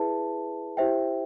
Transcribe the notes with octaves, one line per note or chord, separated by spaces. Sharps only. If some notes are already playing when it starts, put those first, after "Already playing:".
Already playing: E4 G#4 B4 E5 A5
E4 G4 C5 E5 G5